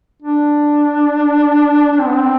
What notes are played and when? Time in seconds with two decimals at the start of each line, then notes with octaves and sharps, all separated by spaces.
0.22 D4
1.91 D4
1.99 C4
2.06 B3
2.13 C4